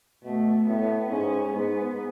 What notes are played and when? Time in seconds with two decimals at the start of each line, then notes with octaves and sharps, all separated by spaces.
0.24 B2 A3
0.67 A2 B3
1.11 G#2 C#4
1.54 G#2 B3